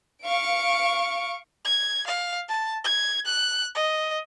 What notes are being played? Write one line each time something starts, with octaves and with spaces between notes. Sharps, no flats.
F5 C#6 D7
G#6
F5
A5
G#6
F#6
D#5